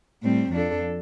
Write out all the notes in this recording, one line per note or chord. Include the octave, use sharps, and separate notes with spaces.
A2 G3 C4
F2 F3 D4 A4